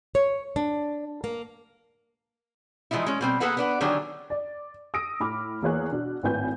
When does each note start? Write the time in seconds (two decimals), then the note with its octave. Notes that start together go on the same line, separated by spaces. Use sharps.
0.15 C#5
0.56 D4
1.24 A#3
2.91 E3 F3 G#3 D#4 E4
3.06 G#3 C#4
3.21 B2 G3 C4
3.40 A#3 B3 G#4 A4 B4 F#5
3.57 B3 D4 B4
3.81 D3 D#3 F#3 D4 G4 G#4
4.30 D5
4.94 D#6 E6 A#6 D7
5.20 A2 B5 D6 F6
5.62 E2 A#3 G#4 C#5 F#6
5.92 B2 D4
6.23 G#1 A2 B4 G#5 G6